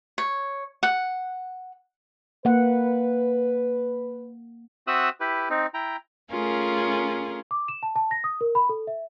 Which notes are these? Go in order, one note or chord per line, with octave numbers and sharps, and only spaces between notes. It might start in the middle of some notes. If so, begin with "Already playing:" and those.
C#5
F#5
A#3 B4 F#5
C4 F#4 E5 D#6 E6 F#6
E4 G4 B4
C4 D#4
E4 G5 A#5
A3 C#4 F4 G#4 A#4
D6
E7
A5
A5
A#6
D#6
A#4
B5
A4
E5